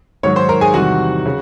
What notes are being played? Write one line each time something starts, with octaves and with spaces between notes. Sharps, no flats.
G#2 D#3 F#3 C#5 C#6
C5 C6
A#4 A#5
G#4 G#5
E2 C3 D#3 G3 F#4 F#5
C#3